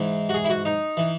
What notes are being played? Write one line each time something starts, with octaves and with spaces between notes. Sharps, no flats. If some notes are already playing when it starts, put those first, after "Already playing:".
Already playing: G#2 E3
F#4
G#4
E4
F#4
D#4
E3